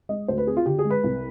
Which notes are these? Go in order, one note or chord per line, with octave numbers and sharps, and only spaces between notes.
G#3 D#5
D2 C5
B4
C4 G#4
F4
D3 G4
G#4
G#3
B4
C2